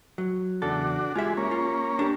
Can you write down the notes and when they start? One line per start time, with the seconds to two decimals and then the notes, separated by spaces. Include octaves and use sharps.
0.18 F#3
0.62 E2 C#3 D4 F#4 A4
1.15 G#3 F4 G4 E5
1.37 A#3 C#4
1.51 F4
1.99 D4 G4